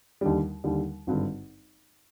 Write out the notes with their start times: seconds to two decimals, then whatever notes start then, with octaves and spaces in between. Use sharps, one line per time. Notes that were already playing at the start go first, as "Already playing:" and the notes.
0.21 D#2 D3 G3
0.64 D#2 D3 G3
1.07 G#1 G2 D3